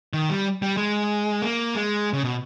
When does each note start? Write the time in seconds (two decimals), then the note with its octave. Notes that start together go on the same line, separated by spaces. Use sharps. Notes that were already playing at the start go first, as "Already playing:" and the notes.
0.13 D#3
0.30 G3
0.62 G3
0.77 G#3
1.42 A#3
1.75 G#3
2.13 C#3
2.24 B2